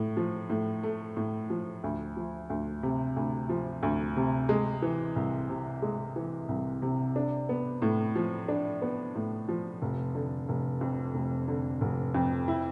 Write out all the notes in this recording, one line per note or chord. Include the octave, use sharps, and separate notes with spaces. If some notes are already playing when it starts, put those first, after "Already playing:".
Already playing: A2
F3
A2
A3
A2
F3
D2
F3
D2
C3
D2
F3
D2
C3
G#3
E3
C2
C3
G#3
E3
C2
C3
D4
B3
A2
F3
D4
B3
A2
F3
F1
D3
F1
F2
F1
D3
F1
F2
E4